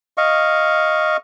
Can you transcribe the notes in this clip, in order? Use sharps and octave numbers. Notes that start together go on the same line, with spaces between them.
D#5 F5 C#6